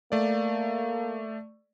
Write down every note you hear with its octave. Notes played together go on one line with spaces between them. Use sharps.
A3 A#3 D5